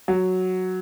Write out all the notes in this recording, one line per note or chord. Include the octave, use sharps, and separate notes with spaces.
F#3